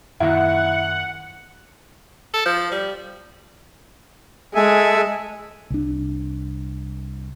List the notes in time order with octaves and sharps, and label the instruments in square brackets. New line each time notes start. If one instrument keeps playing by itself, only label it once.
[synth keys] F#2 A#2 D#3 [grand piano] E4 [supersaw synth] F#5
[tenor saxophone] A4
F3
G3
[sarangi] G#3 [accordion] A4 E5 G#5
[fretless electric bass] C2 D4